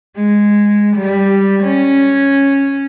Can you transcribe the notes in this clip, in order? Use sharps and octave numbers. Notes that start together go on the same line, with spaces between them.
G#3
G3
C#4